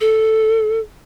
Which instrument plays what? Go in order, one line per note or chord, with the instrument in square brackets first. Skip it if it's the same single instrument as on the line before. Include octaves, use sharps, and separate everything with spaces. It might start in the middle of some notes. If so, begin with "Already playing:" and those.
[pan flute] A4